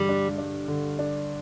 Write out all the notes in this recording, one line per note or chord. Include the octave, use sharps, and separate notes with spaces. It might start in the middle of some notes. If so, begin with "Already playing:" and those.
Already playing: G2 D3 G3
D4
D4
D3
D4